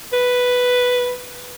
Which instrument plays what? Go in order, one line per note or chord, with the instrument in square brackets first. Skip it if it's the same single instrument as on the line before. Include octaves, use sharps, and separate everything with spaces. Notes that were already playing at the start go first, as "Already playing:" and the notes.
[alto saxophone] B4